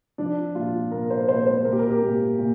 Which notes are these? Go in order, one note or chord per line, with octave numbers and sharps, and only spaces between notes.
F3 D4
A#2 F4
A#2 A#4
C5
A#2 C5
C5
A#2 A#4
G4
A#4
G4
A#2
A#2